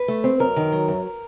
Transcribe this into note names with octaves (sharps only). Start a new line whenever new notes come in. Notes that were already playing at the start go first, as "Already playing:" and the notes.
Already playing: B4
A3
C4
F#2 A#4
D#3
F#3
F#2